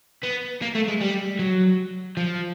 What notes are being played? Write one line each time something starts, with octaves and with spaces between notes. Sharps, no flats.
B3
A#3
A3
G#3
G3
F#3
F3